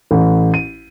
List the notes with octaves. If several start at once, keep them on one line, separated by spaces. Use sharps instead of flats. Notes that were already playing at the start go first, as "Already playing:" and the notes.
A1
D#7